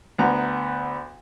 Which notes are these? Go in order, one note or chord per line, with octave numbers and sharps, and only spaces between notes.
D2 B3 A#5